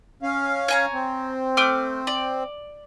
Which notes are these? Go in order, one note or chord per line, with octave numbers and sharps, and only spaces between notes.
C#4 F5
C#5 G#5 A#5
C4
A3 D6 F6
D5